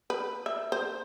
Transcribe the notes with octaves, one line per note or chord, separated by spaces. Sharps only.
B4
E5
C5